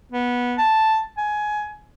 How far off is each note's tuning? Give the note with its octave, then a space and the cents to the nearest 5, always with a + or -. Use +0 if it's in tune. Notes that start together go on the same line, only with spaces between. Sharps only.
B3 -15
A5 +0
G#5 +20